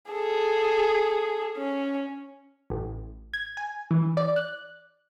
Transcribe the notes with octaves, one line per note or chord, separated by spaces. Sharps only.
G#4 A4
C#4
A1
G#6
G#5
E3
D5
F#6